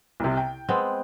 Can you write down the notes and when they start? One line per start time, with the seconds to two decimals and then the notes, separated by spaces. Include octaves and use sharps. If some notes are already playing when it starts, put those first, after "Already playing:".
0.20 C2 C3
0.37 G5
0.69 G#3 B3 C4